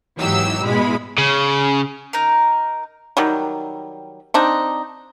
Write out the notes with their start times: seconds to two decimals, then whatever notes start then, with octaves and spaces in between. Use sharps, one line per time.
0.18 G#1 E3 F#3 D#4 G4 E6
0.65 B2 G#3 E4 B5
1.18 C#3
2.13 D#4 A#4
3.17 D#3 F#3 G3
4.34 C4 D4 D#4